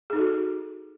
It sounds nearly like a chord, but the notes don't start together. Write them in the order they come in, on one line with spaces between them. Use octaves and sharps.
G#4 D#4 A4 F#4